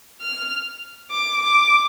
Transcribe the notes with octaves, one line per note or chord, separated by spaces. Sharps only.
F6
D6
D6